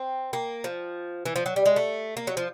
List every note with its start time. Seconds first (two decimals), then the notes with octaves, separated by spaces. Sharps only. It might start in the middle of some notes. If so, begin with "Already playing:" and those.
Already playing: C4
0.33 A#3
0.64 F3
1.26 E3
1.36 F3
1.46 F#3
1.56 G3
1.66 G#3
1.76 A3
2.17 A#3
2.27 F#3
2.37 F3